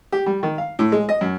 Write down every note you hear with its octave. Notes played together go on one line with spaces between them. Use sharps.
G4
G3
D#3
F5
A2
G#3
D#5
F#2